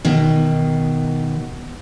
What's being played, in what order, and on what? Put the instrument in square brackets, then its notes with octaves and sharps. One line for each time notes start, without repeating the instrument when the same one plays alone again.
[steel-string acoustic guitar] B2 D#3